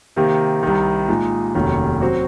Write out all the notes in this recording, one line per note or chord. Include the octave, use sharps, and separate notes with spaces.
C3 D#3 A#3
C2 C3 D#3
A#2 G#3 D#4
F1 D#2 D#3 F#3 C#4
F#3 C4 F#4